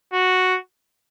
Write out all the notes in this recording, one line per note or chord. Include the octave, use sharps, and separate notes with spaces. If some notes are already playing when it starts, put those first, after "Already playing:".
F#4